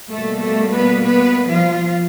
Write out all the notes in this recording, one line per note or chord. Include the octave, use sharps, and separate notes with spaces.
B2 G3 A3 A#3 A4
A3 A4
B3 B4
B3 B4
F3 F4